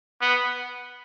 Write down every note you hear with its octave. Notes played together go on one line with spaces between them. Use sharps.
B3